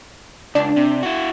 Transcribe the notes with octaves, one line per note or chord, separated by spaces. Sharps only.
C#2 D4
C3
E4 F#4